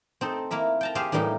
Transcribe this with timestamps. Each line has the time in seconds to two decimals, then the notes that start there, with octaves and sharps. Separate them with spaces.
0.21 C4 D#4 A4
0.51 A#3 E4 A#4 E5
0.81 G5 A5 A#5
0.95 G4 G#4 C5 E5 F5
1.12 A2 E3 G3 A#3 D#4 E4